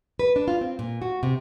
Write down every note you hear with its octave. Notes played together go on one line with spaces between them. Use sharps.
B4
D4
F4
C4
A#2
F#4
C3